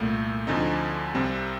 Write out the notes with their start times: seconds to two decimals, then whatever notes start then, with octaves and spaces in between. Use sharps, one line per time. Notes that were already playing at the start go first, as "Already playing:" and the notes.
Already playing: C2 A#2 A3
0.47 D2 D3 F3 C4 D#4
1.15 C2 C3 G3 C4